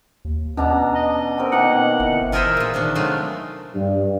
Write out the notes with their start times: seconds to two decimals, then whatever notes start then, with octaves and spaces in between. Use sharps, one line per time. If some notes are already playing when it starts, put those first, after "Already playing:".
0.25 D#2
0.57 B2 C#4 D4 A#5
0.95 D#5
1.38 C4 A#4
1.52 B2 D#3 A#3 F#5
2.00 G1 E3
2.32 E3 F4 G#4 A#4 C5 E5
2.57 A#2 F4
2.74 C3 D#3 D4
2.95 F#3 G#3 A3 F4
3.74 G2